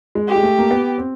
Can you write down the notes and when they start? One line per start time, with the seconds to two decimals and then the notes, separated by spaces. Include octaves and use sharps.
0.15 G#3
0.29 G4
0.36 G#3
0.43 A3
0.59 A#3
0.71 B3
0.98 C4